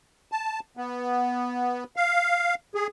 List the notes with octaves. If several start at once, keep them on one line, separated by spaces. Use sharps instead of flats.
A5
B3
F5
G#4